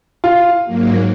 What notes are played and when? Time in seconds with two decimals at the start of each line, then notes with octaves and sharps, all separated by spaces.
0.24 F4
0.65 G#2 F#3 A#3